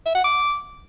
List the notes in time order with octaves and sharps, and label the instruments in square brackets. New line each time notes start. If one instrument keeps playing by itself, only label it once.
[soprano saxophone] E5
F#5
D6